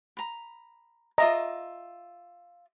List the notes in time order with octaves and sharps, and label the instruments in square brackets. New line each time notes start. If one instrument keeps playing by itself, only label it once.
[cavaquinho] A#5 B5
[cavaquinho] F4 E5 D6 [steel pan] D#5 A#5